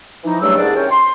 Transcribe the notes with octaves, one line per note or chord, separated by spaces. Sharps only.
E3 F3 D#4
G2 C#3 F#3 G3 A3 E6
C2 G#2 D4 G#4 D5
D#2 C3 C#4 C#5 G5
C6